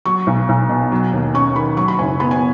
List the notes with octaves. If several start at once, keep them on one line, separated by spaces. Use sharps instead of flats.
F#3 C#6
B1
B1
B2
F#3
D#2
C#4 C#6
D#3 B5
F#3 C#6
B5
F#1 G#5
B3 B5
G#5